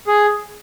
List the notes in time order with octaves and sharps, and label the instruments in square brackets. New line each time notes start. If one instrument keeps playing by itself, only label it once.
[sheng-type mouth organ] G#4